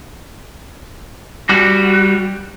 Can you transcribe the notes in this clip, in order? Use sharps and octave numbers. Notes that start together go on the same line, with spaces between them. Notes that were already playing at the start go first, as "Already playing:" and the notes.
G3 F#4